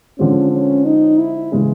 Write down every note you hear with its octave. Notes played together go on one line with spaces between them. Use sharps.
D3 F3 G#3 C4 C#4
C#4
D#4
E4
C#3 E3 G#3 C#4